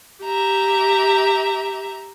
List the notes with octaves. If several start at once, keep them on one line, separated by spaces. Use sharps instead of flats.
G4 E5 A#5